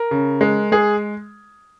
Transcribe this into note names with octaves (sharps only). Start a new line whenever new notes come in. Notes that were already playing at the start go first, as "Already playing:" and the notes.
Already playing: A#4
C#3
G#3
G#3 G#4